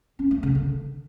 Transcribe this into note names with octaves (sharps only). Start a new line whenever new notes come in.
C#4
A3
C#3
D3